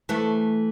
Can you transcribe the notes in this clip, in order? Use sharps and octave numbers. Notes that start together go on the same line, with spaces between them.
E3 A3